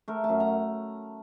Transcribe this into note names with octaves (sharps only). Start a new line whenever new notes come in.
A3 A#4
A5
F#2
A#5